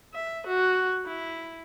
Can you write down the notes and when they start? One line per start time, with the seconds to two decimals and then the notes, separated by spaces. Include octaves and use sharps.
0.14 E5
0.47 F#4
1.07 E4